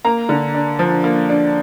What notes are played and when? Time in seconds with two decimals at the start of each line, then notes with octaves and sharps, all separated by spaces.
0.05 A#3 A#5
0.29 D3
0.54 D4
0.79 F3
1.04 A#3
1.29 D4